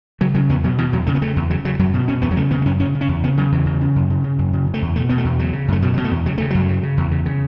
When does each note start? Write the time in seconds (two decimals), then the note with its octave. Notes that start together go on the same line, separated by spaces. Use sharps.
0.21 C#3 F#3
0.35 C#3 F#3
0.49 E2 B3
0.64 B2 F#3
0.78 B2 E3
0.92 E2 F#3
1.06 C#3 A3
1.15 B3
1.22 C#3 A3
1.36 E2
1.50 C#3 F#3
1.65 C#3 F#3
1.79 F#2 F#3
1.94 B2
2.08 B2 C#4
2.22 E2 B3
2.31 F#3
2.36 C#3 A3
2.51 C#3 B3
2.62 B3
2.65 F#2 C#4
2.80 C#3 C#4
2.94 C#3
3.01 C#4
3.09 E2
3.24 C#3 B3
3.37 C#3 F#3
3.52 E2 E3
3.66 C#3
3.81 C#3
3.96 F#2
4.10 C#3
4.24 C#3
4.38 F#2
4.53 C#3
4.67 C#3
4.74 A3
4.82 E2
4.96 B2 A3
5.09 B2 B3
5.18 A3
5.25 E2
5.39 C#3 F#3
5.53 C#3
5.68 F#2 A3
5.82 B2 F#3
5.94 B2 F#3
6.04 A3
6.11 E2
6.26 C#3 F#3
6.38 C#3 A3
6.50 F#2 F#3
6.69 C#3
6.83 C#3
6.97 E2
7.11 C#3
7.26 C#3